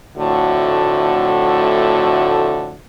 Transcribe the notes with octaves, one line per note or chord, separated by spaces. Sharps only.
F2 A2 D3 A3 F#4